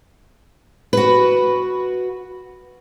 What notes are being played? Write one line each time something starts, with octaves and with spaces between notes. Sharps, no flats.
F#4 B4